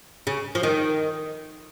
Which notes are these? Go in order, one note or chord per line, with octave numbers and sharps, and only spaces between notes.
C#3
F3
D#3